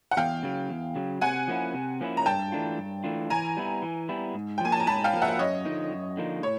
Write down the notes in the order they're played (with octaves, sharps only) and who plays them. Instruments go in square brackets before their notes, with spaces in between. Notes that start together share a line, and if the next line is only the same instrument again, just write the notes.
[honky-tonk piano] F#5
[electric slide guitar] E2 [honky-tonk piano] F5 G5
[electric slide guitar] C#3 F#3
E2
C#3 F#3
[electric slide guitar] C3 [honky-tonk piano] F#5 G#5
[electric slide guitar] F3 A#3 C#4 E4
C3
F3 A#3 C#4 E4
[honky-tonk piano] A#5
[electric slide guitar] G2 [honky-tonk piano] G5 A5
[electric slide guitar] E3 A3 D4 F4
G2
E3 A3 D4 F4
[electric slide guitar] E3 [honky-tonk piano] G#5 A#5
[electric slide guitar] G3 B3 E4
E3
G3 B3 E4
G#2
[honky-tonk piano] G5
[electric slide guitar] F3 A#3 [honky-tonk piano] G#5
[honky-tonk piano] A5
A#5
[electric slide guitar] G#2 [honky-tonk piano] A5 B5
[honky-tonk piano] F5 G5
[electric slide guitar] F3 A#3
[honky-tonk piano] E5 F#5
[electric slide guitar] F#2 [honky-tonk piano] C#5 D#5
[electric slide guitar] D3 F3 A#3 D#4
F#2
D3 F3 A#3 D#4
[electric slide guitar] A2 [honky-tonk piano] C#5